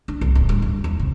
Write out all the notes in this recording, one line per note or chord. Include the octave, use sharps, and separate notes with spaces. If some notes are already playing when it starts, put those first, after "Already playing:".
D4
C2
D1
G2
G2
D#2
C3